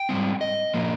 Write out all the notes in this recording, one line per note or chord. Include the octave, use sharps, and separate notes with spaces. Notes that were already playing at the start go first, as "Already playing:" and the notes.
Already playing: G5
G#2 G3 C4
D#5
A#2 F3 A#3